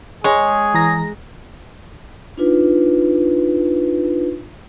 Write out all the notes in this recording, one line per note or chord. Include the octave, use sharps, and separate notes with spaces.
G#3 G#4 C#5
E3 A#5 A#6
D4 D#4 F4 B4